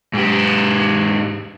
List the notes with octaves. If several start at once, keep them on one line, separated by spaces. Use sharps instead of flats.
G#2 G4